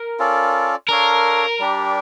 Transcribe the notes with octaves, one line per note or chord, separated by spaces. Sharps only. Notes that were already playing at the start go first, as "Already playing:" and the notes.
Already playing: A#4
C#4 F4 A4 D5
D4 A4 A#4 C#5 F5
G3 D4 G4